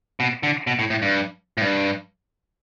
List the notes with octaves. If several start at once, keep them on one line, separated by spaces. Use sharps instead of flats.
B2
D3
B2
A2
A2
G2
A2
G2